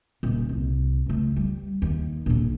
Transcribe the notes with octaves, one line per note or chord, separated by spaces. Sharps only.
D#1
C2
C#2 A3
G3
D#2
A#1 D#2